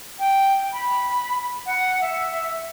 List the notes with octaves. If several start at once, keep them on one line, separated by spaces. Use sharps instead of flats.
G5
B5
F#5
E5